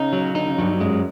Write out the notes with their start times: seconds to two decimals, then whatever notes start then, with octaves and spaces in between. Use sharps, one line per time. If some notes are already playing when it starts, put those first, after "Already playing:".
Already playing: C#3 D#4
0.13 F#3
0.35 D3 D#4
0.46 C#3
0.58 G2 F#3
0.70 G2
0.80 F#2 G#3